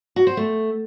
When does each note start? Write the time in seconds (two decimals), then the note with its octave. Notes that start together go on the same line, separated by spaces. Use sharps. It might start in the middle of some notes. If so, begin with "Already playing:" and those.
0.16 F#4
0.27 C5
0.37 A3